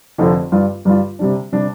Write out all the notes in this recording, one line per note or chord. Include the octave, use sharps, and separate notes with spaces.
F1 F2 D3 F3 A3
G2 G3 F4
G2 G3 F4
C3 G3 D4
C3 G3 D4